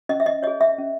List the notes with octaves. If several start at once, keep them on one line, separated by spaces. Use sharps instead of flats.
C#4 D#5
E5
D#5
G#4 C#5 D#5
E5
C#4